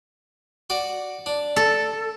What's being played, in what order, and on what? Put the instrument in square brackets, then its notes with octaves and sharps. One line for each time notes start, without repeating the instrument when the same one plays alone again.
[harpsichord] F#4 D5
D4
[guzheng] A4